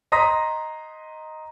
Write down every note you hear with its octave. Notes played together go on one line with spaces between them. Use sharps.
D#5 A#5 C6 D#6 A#6 B6